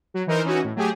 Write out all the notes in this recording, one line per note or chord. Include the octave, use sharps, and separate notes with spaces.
F#3
E3 D#4 A#4 C5
E3 C#4 D#4 F#4
A2
F#3 A3 G4 G#4